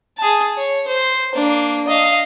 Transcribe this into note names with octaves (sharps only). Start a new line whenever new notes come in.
G#4 A5
C#5
C5
A#3 D4
D#5 F5